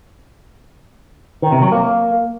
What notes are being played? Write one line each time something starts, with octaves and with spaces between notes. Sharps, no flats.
D#3
C3
F#3
A#3